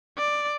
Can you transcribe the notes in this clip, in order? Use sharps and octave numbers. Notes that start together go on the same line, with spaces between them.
D5